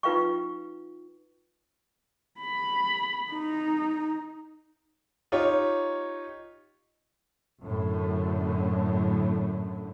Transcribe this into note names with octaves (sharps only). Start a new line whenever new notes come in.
D#4 F4 B4 F5 G5 C#6
B5
D#4
D#4 F4 G4 C#5
F#2 A2 D3